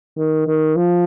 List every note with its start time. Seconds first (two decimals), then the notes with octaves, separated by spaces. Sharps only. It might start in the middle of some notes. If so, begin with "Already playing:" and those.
0.18 D#3
0.47 D#3
0.76 F3